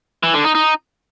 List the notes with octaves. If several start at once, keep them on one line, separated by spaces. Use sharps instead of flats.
E3
D3
D#4
D#4